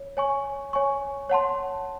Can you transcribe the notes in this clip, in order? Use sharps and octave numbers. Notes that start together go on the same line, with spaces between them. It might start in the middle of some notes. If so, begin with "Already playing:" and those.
Already playing: C#5
C#5 G#5 C#6
C#5 G#5 C#6
C#5 F#5 A5 C6